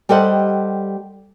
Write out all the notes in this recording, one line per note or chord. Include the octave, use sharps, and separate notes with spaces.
G3 G4 A4 C5 D#5 F#5